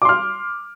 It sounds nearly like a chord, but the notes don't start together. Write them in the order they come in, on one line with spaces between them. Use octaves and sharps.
D6 C6 F6